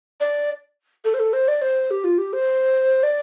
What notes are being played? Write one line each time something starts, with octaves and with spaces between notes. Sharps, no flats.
D5
A4
C5
A4
C5
D5
C5
G4
F4
G4
C5
D5